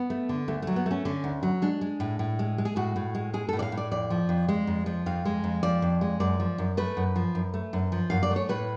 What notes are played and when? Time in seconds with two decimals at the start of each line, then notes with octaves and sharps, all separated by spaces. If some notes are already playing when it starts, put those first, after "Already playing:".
Already playing: B3
0.10 A3
0.29 D3
0.48 D2 A3
0.62 F#3 A3
0.76 B3
0.86 A3 C#4
1.05 D3 C#4
1.24 D2
1.43 F#3
1.62 G#3 D4
1.81 G#3
2.00 A2
2.19 A2
2.39 G#3
2.58 G#3
2.65 G#4
2.76 A2 F#4
2.96 A2
3.15 G#3
3.34 G#3 G#4
3.49 A2 A4
3.59 D5
3.62 F5
3.72 A2
3.78 D5
3.91 F2 D5
4.10 F3
4.29 F2
4.48 G#3
4.67 F2
4.86 F3
5.06 F2 F5
5.25 G#3
5.44 F2
5.63 F3 D5
5.82 F2
6.01 G#3
6.20 F#2 D5
6.40 F3
6.58 F#2
6.77 A3 B4
6.97 F#2
7.16 F3
7.35 F#2
7.54 A3
7.73 F#2
7.92 F3
8.10 F#2 F5
8.23 D5
8.31 A3
8.36 C#5
8.49 A2 B4